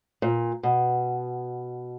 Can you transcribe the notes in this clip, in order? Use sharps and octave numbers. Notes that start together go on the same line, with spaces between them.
A#2
B2